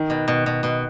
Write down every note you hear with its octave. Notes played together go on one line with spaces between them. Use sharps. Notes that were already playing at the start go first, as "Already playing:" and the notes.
Already playing: D#3
B2
B2
B2
B2